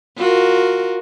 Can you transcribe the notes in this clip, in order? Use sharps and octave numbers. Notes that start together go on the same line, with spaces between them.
F4 F#4 A#4